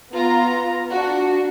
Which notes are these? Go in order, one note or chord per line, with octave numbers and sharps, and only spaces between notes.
B3 F4 A#5
D4 F#4